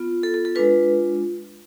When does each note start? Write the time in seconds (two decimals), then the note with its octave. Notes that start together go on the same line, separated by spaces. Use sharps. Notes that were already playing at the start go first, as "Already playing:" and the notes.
Already playing: B3 F4
0.23 A4
0.34 A4
0.45 A4
0.55 G#3 D4 F4 B4